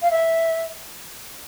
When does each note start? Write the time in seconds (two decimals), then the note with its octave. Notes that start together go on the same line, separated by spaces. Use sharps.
0.02 F5
0.11 E5